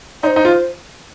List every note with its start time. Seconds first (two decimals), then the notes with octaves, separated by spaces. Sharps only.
0.23 D#4 D5
0.27 C5
0.36 D#4
0.45 F4